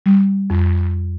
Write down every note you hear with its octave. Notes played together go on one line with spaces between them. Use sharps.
G3
F2